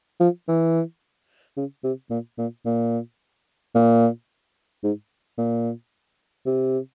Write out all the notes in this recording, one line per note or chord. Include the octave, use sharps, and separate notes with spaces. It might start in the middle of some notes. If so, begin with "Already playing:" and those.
F3
E3
C#3
C3
A#2
A#2
A#2
A#2
G#2
A#2
C3